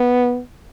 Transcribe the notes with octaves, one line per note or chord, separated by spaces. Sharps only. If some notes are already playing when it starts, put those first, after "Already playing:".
Already playing: B3